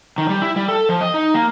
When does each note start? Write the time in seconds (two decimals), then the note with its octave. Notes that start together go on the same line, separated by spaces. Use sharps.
0.18 D#3
0.29 G3
0.42 E4
0.56 G3
0.68 A4
0.89 F3
1.01 D#5
1.14 D#4
1.34 A#3